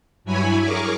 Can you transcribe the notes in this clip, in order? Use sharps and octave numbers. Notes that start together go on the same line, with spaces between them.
G2 F#3 E4 C#5 G#5 B5
G#4 A#4 C#6 D6